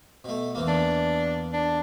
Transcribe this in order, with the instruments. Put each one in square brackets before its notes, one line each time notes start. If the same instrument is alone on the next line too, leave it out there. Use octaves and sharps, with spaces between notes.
[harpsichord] B2 A3
E2 E3 A#3
[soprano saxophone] D4
D4